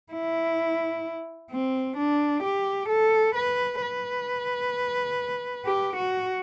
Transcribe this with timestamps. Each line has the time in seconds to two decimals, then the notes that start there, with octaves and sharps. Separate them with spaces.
0.13 E4
1.51 C4
1.97 D4
2.44 G4
2.89 A4
3.35 B4
3.82 B4
5.66 G4
5.96 F#4